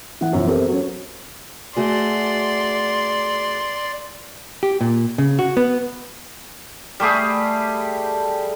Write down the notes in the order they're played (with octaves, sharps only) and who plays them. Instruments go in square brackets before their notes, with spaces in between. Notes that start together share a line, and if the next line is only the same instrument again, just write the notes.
[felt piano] E3 F#5
F#2 B2 E3 F3
B3 C4 G4 A4 A#4
F#3 C#4
[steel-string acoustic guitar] A3 F#4 G#4 [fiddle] D5 C6
[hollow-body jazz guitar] G4
A#2
C#3
F#4
B3
[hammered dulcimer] G3 A3 G4 G#4